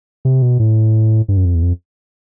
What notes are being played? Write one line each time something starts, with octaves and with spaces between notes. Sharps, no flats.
C3
B2
A2
G2
F#2
F2
E2
F2